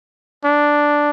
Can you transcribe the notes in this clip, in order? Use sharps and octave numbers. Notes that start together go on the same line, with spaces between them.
D4